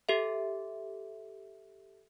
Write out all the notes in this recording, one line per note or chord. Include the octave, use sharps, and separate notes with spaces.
G4 A4 E5